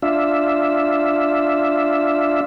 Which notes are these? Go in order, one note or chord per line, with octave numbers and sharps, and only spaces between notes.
D4 F4 E5